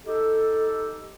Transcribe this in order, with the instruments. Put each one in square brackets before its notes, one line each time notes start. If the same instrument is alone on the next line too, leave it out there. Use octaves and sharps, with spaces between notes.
[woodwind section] D#4 G4 A4